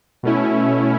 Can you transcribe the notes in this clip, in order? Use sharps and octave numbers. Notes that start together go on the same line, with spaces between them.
B2 A3 C#4 E4